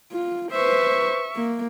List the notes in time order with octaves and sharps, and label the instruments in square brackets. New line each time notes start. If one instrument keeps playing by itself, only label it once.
[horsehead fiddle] F4
[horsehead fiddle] B4 C5 [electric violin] E5 C#6
[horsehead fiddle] A#3